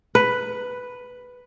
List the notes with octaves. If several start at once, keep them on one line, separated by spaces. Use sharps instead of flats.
B4